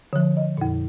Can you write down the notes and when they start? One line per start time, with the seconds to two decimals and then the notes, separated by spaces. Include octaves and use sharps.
0.13 D3 F3
0.37 D#5
0.57 F2 A#2